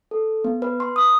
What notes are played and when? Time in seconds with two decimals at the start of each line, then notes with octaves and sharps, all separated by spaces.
0.11 A4
0.44 B3
0.62 B4
0.80 C6
0.96 D#6